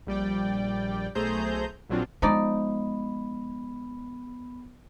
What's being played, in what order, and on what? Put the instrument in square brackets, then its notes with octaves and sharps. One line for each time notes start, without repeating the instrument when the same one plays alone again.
[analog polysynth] A#1 G3 D5 G5
B1 A3 G#4 C5 A#5 G6
A#1 A#2 F#3 C4 D4 F4
[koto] F3 D#4 D5 [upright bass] G#3 [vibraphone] B3 B5